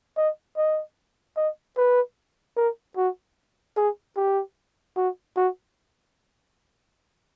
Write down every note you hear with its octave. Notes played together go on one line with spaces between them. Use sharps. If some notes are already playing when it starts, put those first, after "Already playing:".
D#5
D#5
D#5
B4
A#4
F#4
G#4
G4
F#4
F#4